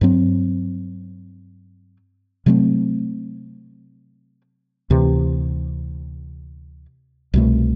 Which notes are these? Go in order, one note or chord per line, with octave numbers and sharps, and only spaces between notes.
G2 F#3 C4
C3 F#3 A3 C4
D2 C3 E3
C2 B2 A3